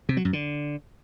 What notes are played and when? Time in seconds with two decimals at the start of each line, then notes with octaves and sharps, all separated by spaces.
0.09 C3
0.17 F#3
0.25 F#2
0.33 D3